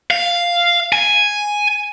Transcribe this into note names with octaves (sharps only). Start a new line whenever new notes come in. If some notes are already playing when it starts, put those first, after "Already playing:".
F5
G#5